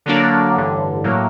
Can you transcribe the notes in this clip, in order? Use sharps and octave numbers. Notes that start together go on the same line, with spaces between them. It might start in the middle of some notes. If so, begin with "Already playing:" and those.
D3 F#3 A#3 D4
A1 G2 D3
A2 F#3 A#3